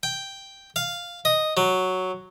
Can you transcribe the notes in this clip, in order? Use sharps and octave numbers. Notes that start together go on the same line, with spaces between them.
G5
F5
D#5
F#3